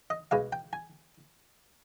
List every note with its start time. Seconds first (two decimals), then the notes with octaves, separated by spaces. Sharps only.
0.10 D#5
0.31 B1 B2 G#3 F5
0.52 G5
0.73 G#5